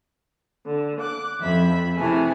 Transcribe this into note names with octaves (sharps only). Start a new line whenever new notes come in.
D3
D6 F#6
F2 E5 B5
C3 E3 A3 G#4